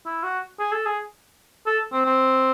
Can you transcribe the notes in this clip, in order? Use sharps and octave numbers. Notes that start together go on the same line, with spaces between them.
E4
F#4
G#4
A4
G#4
A4
C4
C4